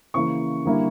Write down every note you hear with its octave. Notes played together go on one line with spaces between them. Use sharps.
C#3 E3 A#3 C#6
D3 G3 A#3 E4